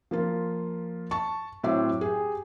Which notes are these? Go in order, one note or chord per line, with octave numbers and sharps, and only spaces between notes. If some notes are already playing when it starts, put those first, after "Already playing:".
F3 A#3 F4
A5 C#6
A2 F#3 C4 E5 D6
G4 G#4